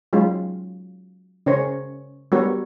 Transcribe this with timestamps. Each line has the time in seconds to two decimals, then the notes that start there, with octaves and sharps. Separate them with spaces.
0.13 F#3 G#3 C#4 F4
1.46 C#3 C#4 A#4 C5 C#5
2.32 G3 B3 F#4 A#4 C#5